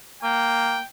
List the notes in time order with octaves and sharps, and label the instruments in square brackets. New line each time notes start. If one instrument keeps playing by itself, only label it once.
[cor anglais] A#3 [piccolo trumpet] G5